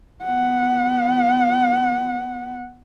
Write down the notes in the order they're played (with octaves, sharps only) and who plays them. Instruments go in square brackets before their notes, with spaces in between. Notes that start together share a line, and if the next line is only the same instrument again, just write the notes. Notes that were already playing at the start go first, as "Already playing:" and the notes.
[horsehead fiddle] B3 F#5